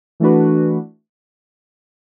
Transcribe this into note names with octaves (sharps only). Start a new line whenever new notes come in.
E3 A3 D4 F#4 B4